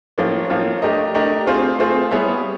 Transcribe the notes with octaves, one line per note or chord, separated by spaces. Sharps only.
A2 F3 A#3 C#4 F4
A2 F3 A#3 C#4 F4
A3 D4 G4 A#4 D#5
A3 D4 G4 A#4 D#5
A3 C4 F4 G#4 C5
A3 C4 F4 G#4 C5
G3 B3 E4 G#4 C#5